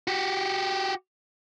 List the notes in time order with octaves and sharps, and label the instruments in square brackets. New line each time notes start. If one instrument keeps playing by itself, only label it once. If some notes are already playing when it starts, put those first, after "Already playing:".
[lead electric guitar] F#4 G4